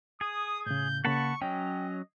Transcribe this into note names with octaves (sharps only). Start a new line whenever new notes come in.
G#4 D#6
A2 C#3 G6
C#3 A#3 F#5 A5 B5 C#6
F#3 C#4 D#5 G5